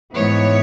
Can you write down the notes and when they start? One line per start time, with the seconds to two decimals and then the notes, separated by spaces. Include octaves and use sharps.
0.15 G#2 E3 B3 C#5